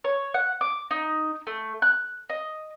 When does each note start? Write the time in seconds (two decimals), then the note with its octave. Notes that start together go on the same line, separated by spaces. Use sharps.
0.04 C#5
0.34 F#5
0.61 D6
0.91 D#4
1.47 A3
1.82 F#6
2.30 D#5